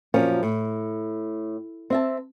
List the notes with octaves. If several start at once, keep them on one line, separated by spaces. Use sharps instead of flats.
F#2 A#2 F3 C#4
A2
C4 E5 A5